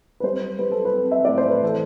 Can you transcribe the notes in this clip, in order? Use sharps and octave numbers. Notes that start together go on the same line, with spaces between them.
B4
G3 C5
G3 B4
A4
B4
C4
E5
A2 D5
C5
B4
E3 A4